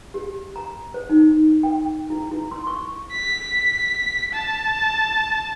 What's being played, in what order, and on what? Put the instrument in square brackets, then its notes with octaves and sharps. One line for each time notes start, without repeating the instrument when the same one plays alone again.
[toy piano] G4
A#5
C5
D#4
G5
E4
E4
C6
C#6
[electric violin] B6
A5